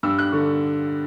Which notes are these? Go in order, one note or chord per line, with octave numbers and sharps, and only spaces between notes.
G2 E6
F#6
D3 C#6